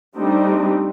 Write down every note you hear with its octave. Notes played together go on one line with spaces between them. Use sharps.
G3 A3 C4 D4 D#4